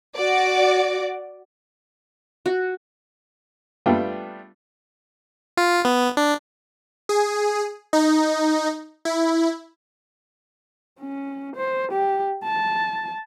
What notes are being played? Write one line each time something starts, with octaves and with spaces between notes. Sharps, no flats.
F#4 D5
F#4
G3 A3 B3 D4 F4 G5
F4
B3
D4
G#4
D#4
E4
C#4
C5
G4
A5